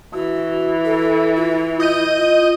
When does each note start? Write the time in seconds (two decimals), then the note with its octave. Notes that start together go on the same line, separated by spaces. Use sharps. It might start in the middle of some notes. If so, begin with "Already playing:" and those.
0.14 E3 F#4
0.85 A4
1.36 F4
1.80 E4 D#5 G6 D#7
2.17 F4